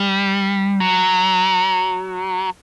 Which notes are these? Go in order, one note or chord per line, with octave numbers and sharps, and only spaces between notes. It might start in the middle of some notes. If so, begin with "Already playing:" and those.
Already playing: G3
F#3